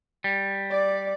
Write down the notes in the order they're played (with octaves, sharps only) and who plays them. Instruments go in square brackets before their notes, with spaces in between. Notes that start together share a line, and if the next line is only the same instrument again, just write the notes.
[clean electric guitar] G3
[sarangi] D5